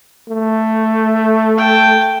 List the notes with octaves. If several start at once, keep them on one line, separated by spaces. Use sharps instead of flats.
A3
G5 A5